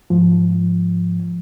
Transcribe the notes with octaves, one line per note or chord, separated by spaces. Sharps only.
G#2 F3